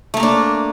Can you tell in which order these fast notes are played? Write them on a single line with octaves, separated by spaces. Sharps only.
A3 A#3 A#4 D4